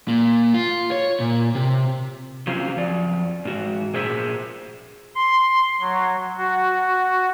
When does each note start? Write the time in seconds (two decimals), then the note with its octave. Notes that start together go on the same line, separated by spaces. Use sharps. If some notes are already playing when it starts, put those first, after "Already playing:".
0.08 A#2
0.54 F4
0.91 C#5
1.20 A#2
1.55 C3
2.47 C#3 F#3 C4 F4
2.76 F2 D5
3.45 G#2 F#4
3.94 A#2 G#4 C5 E5
5.15 C6
5.81 F#3
6.37 F#4